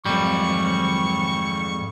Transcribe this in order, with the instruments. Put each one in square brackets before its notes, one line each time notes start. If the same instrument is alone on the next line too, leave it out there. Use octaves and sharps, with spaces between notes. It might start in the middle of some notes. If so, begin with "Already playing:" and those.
[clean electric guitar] F2 G3 [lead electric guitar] G#2 A#4 [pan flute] F#3 [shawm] C#6